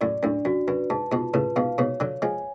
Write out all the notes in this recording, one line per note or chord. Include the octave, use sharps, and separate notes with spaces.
F#2 A2 D5
F#2 A2 D4
F#2 F#4
F#2 B4
G#2 A5
G#2 B2 F4
A2 C#3 B4
G#2 B2 F5
G#2 B2 C#5
D3 F#3 C#5
F3 G#3 G#5